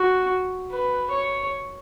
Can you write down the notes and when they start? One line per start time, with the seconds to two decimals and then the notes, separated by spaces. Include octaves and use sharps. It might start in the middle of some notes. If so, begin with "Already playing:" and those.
Already playing: F#4
0.72 B4
1.10 C#5